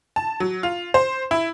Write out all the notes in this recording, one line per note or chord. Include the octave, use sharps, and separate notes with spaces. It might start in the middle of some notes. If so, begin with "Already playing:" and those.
A5
F#3
F4
C5
E4